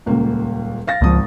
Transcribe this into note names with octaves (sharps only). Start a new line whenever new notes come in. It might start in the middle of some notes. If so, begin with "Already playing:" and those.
D#1 C#2 A#3
F5 A6 A#6
G#1 C#2 G#2 F3 D#6